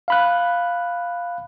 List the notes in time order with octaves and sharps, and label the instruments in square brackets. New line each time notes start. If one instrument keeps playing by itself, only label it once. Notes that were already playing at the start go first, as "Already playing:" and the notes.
[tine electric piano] F5 B5 F#6